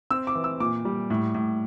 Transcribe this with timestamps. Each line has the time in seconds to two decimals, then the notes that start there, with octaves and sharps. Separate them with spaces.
0.11 C4 E6
0.27 D6
0.35 E3
0.44 E6
0.60 A#2 D6
0.85 G3
1.10 A2
1.35 A2